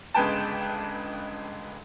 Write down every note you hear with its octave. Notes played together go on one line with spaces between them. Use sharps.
G1 C#2 G#3 B4 G5 A5